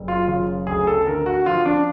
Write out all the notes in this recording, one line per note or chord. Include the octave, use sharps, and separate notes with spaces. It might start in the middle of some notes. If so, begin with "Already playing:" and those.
Already playing: F#1
F4
C#3 F4
D2 G#4
A4
D3 A#4
F#4
F3 F4
D4